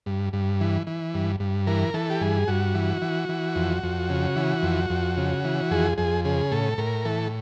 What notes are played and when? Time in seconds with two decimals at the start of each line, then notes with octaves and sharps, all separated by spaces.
0.06 G2
0.33 G2
0.60 E3
0.87 E3
1.14 G2
1.40 G2
1.67 E3 A#4
1.94 E3 A4
2.10 G4
2.21 G2 G#4
2.48 G2 F#4
2.74 E3
3.02 E3
3.29 E3
3.56 F2
3.83 F2
4.10 C#3
4.36 E3
4.63 F2
4.90 F2
5.17 C#3
5.44 E3
5.71 F2 G#4
5.98 F2 G#4
6.25 C#3 G#4
6.52 A2 A4
6.78 A2 A#4
7.05 E3 A4